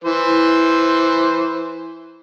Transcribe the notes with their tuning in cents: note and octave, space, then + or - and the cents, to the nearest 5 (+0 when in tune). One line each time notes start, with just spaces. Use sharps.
E3 +0 C5 +0